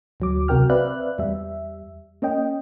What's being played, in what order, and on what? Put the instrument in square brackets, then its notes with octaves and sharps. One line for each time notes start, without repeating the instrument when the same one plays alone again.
[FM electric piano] D2 F#3 D6
C2 C3 F#4 A#4 G5 F6
C4 B4 D5 E5 F5 F#6
E2 G3 E5
A#3 C#4 D#5 G5